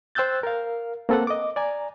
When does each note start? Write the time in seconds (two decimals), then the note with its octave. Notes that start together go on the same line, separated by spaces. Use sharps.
0.15 C5 G5 E6 F#6 G6 A6
0.43 A#4 F5
1.09 A#3 C4 A4 B4 F#5
1.27 D#5 D6
1.56 D5 G#5 A#5